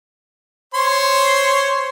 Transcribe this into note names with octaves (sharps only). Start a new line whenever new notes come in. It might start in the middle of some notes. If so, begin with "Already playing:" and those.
C5 C#5 C6